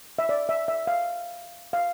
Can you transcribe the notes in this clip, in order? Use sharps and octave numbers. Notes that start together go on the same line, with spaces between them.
E5
D5
E5
E5
F5
F5